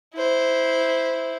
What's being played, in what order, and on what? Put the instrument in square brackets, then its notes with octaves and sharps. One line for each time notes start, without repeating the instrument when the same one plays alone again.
[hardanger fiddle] E4 C5